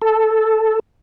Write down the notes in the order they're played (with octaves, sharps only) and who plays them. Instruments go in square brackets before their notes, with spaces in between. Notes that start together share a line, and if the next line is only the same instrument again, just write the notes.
[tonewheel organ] A4